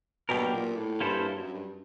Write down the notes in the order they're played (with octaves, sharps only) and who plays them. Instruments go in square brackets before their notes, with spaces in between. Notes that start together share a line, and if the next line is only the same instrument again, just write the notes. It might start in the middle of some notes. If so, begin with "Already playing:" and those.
[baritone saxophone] B2 [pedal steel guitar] F#3 A#3 D4 G4 A#4
[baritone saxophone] A#2
A2
[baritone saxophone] G2 [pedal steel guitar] A#3 C#4 E4 A4 C5
[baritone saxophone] G2
F#2
G2